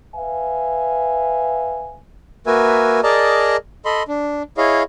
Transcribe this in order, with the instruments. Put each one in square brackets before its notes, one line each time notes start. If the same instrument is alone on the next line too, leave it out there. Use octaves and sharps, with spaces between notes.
[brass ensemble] B4 E5 F5 G#5
[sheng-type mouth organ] A#3 F#4 A#4 B4 E5 G#5
G#4 A#4 D5 D#5 A5 A#5
A4 D#5 B5 C6
D4
E4 G#4 C#5 D#5 F5